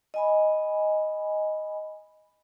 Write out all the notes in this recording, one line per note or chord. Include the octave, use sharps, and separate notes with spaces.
D#5 G#5 B5